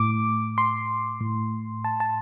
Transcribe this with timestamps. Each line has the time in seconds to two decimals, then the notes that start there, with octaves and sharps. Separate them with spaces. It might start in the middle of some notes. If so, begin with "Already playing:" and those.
Already playing: A2 D6
0.58 C6
1.21 A2
1.84 A5
2.00 A5